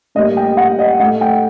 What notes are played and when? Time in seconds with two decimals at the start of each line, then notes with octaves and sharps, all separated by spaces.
0.15 A2 G3 A#3 D#5
0.37 G5
0.57 F#5
0.79 D#5
0.99 A2 A3 F#5
1.21 G5